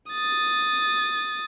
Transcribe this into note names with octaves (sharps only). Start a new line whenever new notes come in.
D#6 A6